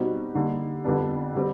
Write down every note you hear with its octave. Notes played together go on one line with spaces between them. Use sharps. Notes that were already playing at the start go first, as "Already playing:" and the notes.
Already playing: B2 G3 C4 D#4 F#4
D3 G3 A#3 D#4
F2 D3 G3 B3 D4
D3 G3 C4